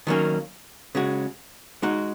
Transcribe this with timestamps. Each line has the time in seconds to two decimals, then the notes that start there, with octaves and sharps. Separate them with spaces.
0.07 D#3 F#3 A#3 C#4
0.95 C#3 G#3 F#4
1.82 G#3 D#4 F#4